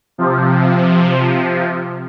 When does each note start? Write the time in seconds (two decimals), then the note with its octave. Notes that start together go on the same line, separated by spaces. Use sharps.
0.18 C3 F3